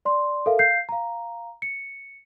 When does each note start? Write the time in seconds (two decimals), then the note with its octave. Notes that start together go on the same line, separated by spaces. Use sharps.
0.05 D5 C6
0.46 A4 A#4 E5 F5
0.59 F5 G6 C7
0.89 F5 A#5
1.62 C#7